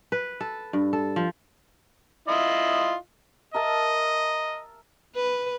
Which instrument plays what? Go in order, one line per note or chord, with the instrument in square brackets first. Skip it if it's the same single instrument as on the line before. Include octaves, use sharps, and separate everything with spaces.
[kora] B4
A4
G2
A4
F3
[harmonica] E4 F4 D#5
[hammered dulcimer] A#4 E5 A5 [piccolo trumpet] D#5
[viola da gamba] B4